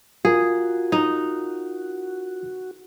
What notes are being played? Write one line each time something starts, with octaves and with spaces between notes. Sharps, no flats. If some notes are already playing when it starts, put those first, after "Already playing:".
F4 F#4 G#4 A#4
D#4